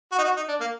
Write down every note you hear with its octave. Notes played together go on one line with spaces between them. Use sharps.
F#4
D#4
F#4
D#4
D4
A#3